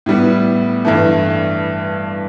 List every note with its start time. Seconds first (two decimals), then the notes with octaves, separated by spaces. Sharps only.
0.06 A2 G3 B3
0.85 G2 E3 A3